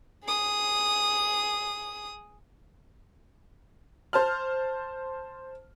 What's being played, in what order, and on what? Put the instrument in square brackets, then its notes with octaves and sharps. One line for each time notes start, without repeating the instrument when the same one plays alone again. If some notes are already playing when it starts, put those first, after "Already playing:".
[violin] G#4 D#6
[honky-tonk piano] C5 A5 F6